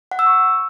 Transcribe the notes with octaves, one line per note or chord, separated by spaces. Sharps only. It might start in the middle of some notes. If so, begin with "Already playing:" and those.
F#5
E6
C#6